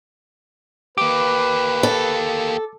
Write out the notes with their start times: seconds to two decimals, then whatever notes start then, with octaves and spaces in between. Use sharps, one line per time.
0.98 A#3 G4 B4 D6
1.83 A4